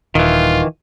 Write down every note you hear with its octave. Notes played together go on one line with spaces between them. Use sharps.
D#1 D#3 E3 F4